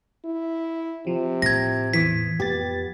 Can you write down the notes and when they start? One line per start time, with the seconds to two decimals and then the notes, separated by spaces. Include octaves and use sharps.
0.25 E4
1.07 C3 F3
1.42 A2 G#6 A#6
1.94 E2 E3 B6
2.40 F2 B3 G4 A6